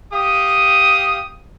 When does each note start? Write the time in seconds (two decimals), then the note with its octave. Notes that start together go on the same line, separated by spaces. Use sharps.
0.13 G4 F5 D#6